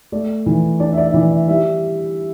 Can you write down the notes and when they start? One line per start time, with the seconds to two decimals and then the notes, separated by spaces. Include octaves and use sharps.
0.12 A3 D5
0.46 E3
0.80 D4 D5
0.93 E5
0.97 D5
1.07 E5
1.14 E3 D5
1.31 E5
1.48 G3 E5